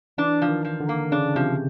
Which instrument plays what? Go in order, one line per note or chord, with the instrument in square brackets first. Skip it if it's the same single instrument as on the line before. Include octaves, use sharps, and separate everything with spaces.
[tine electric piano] E3 [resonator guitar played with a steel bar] D4
[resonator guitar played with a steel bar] F3
[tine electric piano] D#3
[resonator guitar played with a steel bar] F3
[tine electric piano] D3
[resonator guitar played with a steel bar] A#3
[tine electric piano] C#3 [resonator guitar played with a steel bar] D4
[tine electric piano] C3 [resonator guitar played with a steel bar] F3